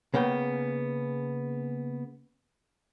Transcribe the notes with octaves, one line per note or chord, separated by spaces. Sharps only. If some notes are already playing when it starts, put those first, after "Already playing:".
C#3 A#3 B3 G5